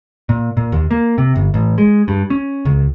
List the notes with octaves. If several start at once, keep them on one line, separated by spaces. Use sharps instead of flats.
A#2
A#2
D#2
A#3
C3
G1
A1
G#3
G2
C#4
C#2